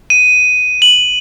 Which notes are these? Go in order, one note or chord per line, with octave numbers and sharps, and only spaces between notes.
D#7
F#7